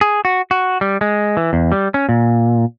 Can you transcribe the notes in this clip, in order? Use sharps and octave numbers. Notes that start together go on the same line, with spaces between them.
G#4
F#4
F#4
G3
G#3
E3
E2
G3
C#4
A#2